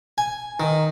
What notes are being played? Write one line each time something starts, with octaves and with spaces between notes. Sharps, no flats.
G#5
D#3